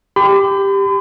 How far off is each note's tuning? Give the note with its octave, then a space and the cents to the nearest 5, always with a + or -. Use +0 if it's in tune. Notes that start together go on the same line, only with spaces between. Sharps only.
G4 +5 B5 +45